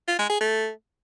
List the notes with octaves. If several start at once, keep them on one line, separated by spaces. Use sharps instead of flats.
F4
G#3
G#4
A3